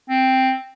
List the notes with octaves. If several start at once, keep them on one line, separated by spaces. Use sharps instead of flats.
C4